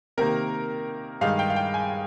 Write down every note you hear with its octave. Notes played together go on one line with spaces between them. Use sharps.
C3 D#3 A#3 A#4
G2 D#3 G#3 D#4 F5
G5
F5
G5
G#5